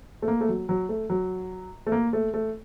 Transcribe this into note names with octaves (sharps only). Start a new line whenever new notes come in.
A3
A#3
A3
F#3
F#3
A3
F#3
A3
A#3
A3
A3